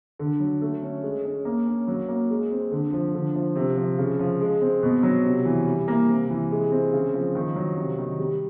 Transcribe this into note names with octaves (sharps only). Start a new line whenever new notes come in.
D3
F#3
A3
C#4
G#3
C#4
A#3
C#4
F#3
A#3
G#3
C4
D3
F3
D3
F3
C3
F3
C#3
F3
G#3
C4
B2
F#3
C3
E3
G3
A#3
C3
E3
G#3
C4
C#3
F3
D#3
F#3
C3
D#3
G3